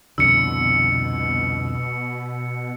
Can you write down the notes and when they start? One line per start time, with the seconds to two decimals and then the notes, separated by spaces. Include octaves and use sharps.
0.18 C2 F2 B2 D3 E6 C#7